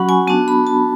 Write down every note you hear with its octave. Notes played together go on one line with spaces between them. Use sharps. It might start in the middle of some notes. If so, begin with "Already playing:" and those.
Already playing: F#3 C#4 F#4 F#5 B5 C#6
G#5
B3 D4 F#4 A5
B5
A5